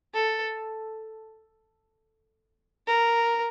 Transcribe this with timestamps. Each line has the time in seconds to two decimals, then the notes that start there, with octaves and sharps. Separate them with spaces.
0.14 A4
2.87 A#4